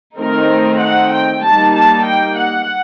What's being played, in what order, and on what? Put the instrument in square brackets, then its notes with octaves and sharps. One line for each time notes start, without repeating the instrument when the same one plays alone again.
[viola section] D#3 A3 C4 D#4 A#4
F#5
G5
G3 A#3 D#4 A5
A5
G5
F#5